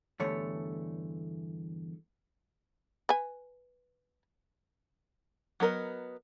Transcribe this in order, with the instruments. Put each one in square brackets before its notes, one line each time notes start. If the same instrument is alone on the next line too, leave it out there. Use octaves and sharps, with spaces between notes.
[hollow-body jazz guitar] E2 G2 D3 A3 C#5
[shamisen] B4 G#5
[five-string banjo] F#3 B3 A#4 D#5